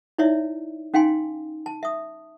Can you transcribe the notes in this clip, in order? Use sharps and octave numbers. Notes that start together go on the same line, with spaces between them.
D#4 E4 C#5 D5 E5
C#4 D#4 F5 G5 G#5 C6
A5
E5 D#6